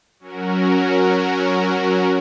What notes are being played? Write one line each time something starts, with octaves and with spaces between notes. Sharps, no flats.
F#3 C#4 F#4 A#4